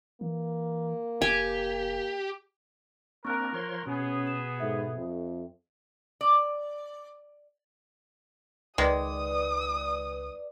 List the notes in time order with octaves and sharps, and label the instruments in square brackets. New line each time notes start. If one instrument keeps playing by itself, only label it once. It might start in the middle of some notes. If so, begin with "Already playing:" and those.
[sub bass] E3 [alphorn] A#3
[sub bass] F1 [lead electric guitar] G4 [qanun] G#5
[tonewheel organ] A#3 C4 D4 [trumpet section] A#4 [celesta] C#6 F#6
[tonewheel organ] F3 C#5 C6
[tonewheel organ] B2 [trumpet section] B3 G#4 [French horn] C#4
[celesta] E7
[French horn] G#2 [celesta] A4 E5
[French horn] F2
[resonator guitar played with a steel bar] D5
[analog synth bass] C#2 [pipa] D#3 G#3 [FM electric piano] B4 D5 [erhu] D#6